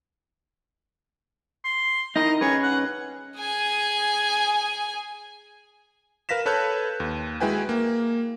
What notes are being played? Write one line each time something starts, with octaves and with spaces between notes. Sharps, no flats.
C6
D#4 E4 A#4 D#5
C#4 G#4 B4 C#5
F#5
G#4 G#5
A#4 B4 F5 A#6 B6 E7
A4 B4 C#5 A5 F#6 G6
D#2
G#3 E4 F#4 B4 G5 G#5
A#3